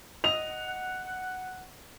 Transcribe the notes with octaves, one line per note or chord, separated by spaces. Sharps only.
D#5 F#5 F7